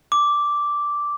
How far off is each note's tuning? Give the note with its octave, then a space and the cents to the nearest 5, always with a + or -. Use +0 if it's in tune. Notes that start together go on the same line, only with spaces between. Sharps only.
D6 -5